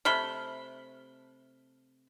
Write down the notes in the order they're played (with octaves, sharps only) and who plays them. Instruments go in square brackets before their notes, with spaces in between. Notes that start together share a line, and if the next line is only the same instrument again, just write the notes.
[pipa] C3 A3 B5 [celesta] F6 G7